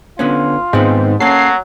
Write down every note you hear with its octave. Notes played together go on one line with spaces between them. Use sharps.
D3 B3 C#4 F4
G#2 D#3 B3 C4
F#3 A#3 C#4 A4 C7